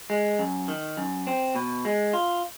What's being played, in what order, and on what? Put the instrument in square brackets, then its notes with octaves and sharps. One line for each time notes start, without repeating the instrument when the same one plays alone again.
[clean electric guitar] G#3
F#2
D#3
F#2
C4
B2
G#3
F4